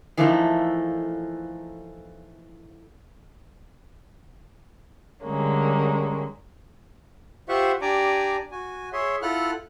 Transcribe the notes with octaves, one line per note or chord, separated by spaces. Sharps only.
E3 F3 A3 A#3 D#4 A4
D3 G3 G#3 A#3 C#4
F4 G4 C5 E5 F#5 C#6
D4 G4 D5 G#5 A#5 D6
F#4 G#5
G#4 C#5 E5 C6
E4 F4 A4 F#5 F6 F#6